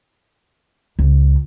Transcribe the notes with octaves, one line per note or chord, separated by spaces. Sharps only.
C#2